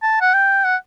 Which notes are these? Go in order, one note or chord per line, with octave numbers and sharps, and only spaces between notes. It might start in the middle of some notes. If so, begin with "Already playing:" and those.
A5
F#5
G5
F#5